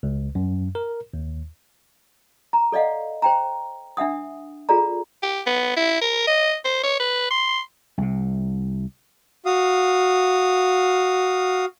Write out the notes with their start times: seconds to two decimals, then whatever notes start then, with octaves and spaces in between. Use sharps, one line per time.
0.03 C#2
0.35 F#2
0.75 A#4
1.14 D#2
2.53 A#5
2.72 A4 D5 D#5 F5 F#5
3.22 C5 G5 A#5
3.97 D4 E5 F#5 D#6
4.69 F4 G#4 A4 D5 A#5
5.23 G4
5.47 B3
5.76 E4
6.01 A#4
6.27 D#5
6.64 C5
6.83 C#5
7.00 B4
7.30 C6
7.98 C2 C3
9.46 F#4 F5 D#6